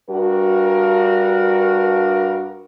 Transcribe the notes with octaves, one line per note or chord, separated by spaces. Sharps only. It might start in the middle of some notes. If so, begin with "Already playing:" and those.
G2 F#4 A#4